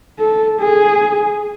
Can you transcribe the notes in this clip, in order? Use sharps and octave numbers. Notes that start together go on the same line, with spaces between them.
A4
G#4